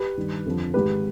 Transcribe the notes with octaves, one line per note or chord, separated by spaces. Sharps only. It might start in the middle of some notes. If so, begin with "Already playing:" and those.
Already playing: G4 B4
G2 D#3
F2 D3 F3
G#2 D#3 G4 B4